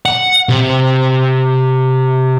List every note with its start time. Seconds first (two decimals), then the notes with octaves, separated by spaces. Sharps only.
0.06 F#5
0.49 C3